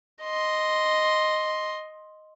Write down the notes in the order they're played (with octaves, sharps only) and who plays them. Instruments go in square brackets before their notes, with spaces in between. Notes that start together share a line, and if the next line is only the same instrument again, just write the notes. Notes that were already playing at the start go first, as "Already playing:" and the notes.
[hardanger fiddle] D#5 C6